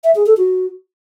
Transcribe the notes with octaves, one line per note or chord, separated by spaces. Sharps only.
E5
G#4
A4
F#4